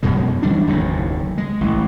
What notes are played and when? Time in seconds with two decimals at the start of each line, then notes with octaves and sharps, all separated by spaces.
0.03 F#2 B2 F3 G#3
0.43 E3 G3 D4
0.67 F#1 D#2 A2
1.38 G#3
1.61 A1 E3